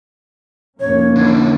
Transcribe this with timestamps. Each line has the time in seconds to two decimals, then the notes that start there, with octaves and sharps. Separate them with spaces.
0.80 F1 A#3 C#4 C#5
1.16 D3 E3